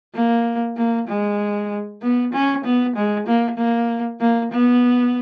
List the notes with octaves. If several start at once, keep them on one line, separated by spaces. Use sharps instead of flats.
A#3
A#3
G#3
B3
C#4
B3
G#3
A#3
A#3
A#3
B3